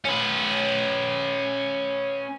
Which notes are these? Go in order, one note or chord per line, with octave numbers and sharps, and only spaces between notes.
C#4 B4